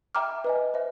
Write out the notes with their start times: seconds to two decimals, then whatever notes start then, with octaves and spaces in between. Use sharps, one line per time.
0.15 E5 G5 A#5 D6 F6
0.44 B4 D#5 G#5
0.74 C5 E5